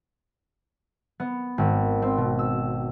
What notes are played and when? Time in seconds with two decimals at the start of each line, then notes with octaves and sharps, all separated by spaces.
1.20 B3
1.58 G#1
2.02 C4
2.18 B2
2.39 E6